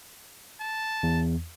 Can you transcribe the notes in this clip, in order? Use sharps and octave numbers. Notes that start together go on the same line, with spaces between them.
A5
E2